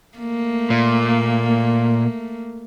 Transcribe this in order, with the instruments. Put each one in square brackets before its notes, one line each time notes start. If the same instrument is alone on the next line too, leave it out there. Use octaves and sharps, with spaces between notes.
[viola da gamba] A3 A#3
[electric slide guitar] A#2